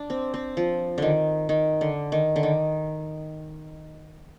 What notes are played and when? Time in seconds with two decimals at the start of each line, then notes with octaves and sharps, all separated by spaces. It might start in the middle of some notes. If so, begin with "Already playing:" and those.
Already playing: D4
0.10 C4
0.34 C4
0.57 F3
0.98 D3 D#3
1.49 D#3
1.81 D3
2.12 D#3
2.36 D3
2.43 D#3